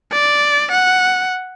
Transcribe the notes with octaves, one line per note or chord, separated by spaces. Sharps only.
D5
F#5